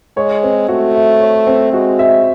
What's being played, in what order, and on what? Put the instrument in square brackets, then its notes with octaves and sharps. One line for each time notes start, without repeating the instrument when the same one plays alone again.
[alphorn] G#3 [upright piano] C#5
[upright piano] C4
[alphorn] A3 [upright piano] F#4
[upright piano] E5
C#5
C4
[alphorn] G#3 [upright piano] F#4
[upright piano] E5